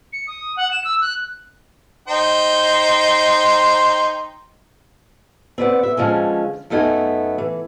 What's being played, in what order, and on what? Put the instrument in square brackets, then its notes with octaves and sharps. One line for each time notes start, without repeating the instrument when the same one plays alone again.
[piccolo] C#7
D#6
F#5
E7
E6
F#6
[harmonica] D#4 C5 G5
[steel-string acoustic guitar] C4 B4 D5 F#5
E5
D3 F3 G#3 C#4
F#2 A3 B3 D#4 F#5 G#5
E3